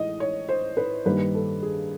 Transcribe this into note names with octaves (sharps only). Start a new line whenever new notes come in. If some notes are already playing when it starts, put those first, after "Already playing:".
Already playing: A2 E3 G#3 D#5
C#5
C5
B4
G2 D#3 G3 A#3 B4
A4
G#4